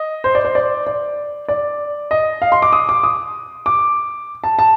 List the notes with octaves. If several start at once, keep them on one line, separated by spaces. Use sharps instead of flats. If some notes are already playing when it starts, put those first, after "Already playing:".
Already playing: D#5
C5
D5
C5
D5
D5
D5
D#5
F5
C6
D6
D#6
D6
D#6
D6
A5
A5